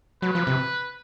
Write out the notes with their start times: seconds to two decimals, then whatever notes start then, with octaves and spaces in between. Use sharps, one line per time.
0.22 F#3 B4
0.35 F3
0.47 C3